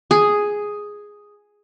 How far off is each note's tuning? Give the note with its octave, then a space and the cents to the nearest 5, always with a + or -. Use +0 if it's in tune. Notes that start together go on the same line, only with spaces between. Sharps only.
G#4 +0